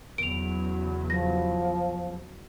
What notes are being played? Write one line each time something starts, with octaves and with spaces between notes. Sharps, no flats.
E2 C#3 F#3 D7 F7
F3 A#6